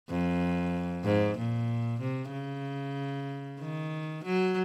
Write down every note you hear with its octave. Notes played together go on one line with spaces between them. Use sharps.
F2
G#2
A#2
C3
C#3
D#3
F#3